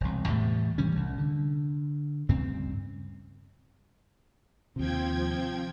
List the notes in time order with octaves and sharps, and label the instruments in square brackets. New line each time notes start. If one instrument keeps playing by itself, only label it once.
[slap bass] E1 C2
E2 A2 C3 A3
C3 E3 G3 C#4
C2
D3
D2 G2 C#3 C4
[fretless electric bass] D#2 C3 [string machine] F3 G5 G#6 [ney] C4